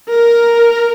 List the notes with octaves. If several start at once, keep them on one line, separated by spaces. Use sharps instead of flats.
A#4